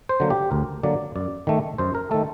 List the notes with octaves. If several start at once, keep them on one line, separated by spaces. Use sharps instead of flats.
C5
D3 F#3 A#3
G4
D2 A#4
D3 F#3 A#3 D5
F#2 D5
D#3 A3
F#2 C5
A#4
D#3 A3 A4